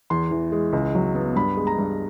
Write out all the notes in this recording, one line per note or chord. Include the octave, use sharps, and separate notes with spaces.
E2 C6
E3
G#3
C#2
F#3
B3
G2 B5
G#3
A#5
G2